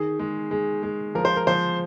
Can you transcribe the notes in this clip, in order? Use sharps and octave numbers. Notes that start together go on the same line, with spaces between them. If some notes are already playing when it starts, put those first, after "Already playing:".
Already playing: D#3 G#4
G#3
G#3
G#3
F3 A#4
C5
A#4
F3 C5